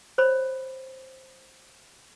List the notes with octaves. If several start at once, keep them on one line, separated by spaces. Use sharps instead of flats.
C5 C#5 B5